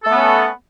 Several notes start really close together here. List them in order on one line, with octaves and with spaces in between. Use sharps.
A4 A3 B3 C#4